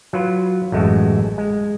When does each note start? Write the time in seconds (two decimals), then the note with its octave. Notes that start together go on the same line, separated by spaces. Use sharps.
0.13 F#3 F4 B4
0.72 A1 F#2 G#3 A3 F#4
1.38 G#3